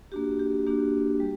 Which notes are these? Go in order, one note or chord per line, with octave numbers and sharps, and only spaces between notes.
A#3 D4 F#4 G4
G4
A#3 D4 F#4 G4
G3